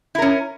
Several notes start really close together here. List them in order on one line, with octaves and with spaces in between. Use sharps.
E4 A#4 C#4